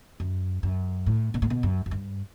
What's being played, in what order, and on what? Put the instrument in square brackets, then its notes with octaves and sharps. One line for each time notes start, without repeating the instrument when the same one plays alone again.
[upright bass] F#2
F#2
A2
B2
A2
B2
F#2
F#2
G2